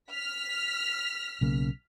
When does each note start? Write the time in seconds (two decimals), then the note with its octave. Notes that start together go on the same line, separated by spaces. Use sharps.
0.12 F6 B6
1.41 B1 C#3 A#3